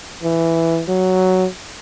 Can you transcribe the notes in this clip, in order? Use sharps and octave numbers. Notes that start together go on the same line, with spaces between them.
E3
F#3